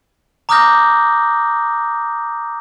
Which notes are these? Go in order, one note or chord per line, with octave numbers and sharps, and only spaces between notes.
A#5 D6 D#6 F6 G6 A#6